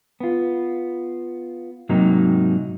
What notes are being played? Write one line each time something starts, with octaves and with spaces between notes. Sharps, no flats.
B3 F4
G#2 C3 F#3 A#3 D#4